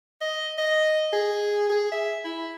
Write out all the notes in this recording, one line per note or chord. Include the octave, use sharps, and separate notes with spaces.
D#5
D#5
G#4
G#4
E5
E4